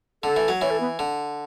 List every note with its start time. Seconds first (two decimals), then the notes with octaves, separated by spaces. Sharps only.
0.23 D3 A4
0.36 E3
0.48 F#3
0.61 E3 C#5
0.70 A4
0.80 B3
0.99 D3